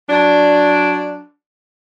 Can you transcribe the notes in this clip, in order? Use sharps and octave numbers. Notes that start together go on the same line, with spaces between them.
F#3 D4